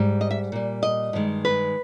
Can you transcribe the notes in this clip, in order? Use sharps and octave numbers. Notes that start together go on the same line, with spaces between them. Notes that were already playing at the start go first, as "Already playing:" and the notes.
Already playing: G#2 G3
D#5
E5
A#2 G3
D#5
G2 D#3 G#3
B4